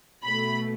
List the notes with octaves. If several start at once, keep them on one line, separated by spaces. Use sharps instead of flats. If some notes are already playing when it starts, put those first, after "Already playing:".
B2 A3 B5